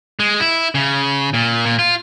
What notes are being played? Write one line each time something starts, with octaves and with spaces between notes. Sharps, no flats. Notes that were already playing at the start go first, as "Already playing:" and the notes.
G#3
E4
C#3
A#2
A#2
F4